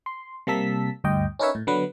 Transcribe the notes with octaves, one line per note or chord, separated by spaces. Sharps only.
C6
C3 G3 A#3 A5 E6 B6
D2 G2 D#5 G5
C#4 D#4 A#4 B4 C#5 E5
A2
D3 F#3 B3 B4